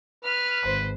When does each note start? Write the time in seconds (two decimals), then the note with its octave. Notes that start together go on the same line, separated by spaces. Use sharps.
0.25 B4 F6
0.63 G#1 C5